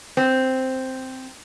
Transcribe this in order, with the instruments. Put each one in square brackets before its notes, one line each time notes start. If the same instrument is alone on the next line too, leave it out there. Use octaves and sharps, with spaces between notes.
[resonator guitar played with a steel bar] C4